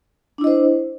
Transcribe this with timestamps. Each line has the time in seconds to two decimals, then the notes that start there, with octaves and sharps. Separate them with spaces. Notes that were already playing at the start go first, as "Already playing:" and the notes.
0.38 D4
0.41 E4
0.44 D#5
0.47 C5